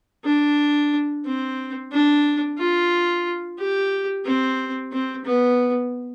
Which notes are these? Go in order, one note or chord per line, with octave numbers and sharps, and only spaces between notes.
D4
C4
D4
F4
G4
C4
C4
B3